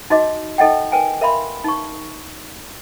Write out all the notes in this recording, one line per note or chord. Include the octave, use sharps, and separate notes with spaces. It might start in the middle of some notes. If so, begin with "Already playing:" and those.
D#4 F#4 D#5 D6
D#4 A4 D#5 F#5 G5
A#4 B4 G5 G#5
A#4 E5 F5 B5 C6
D#4 C#6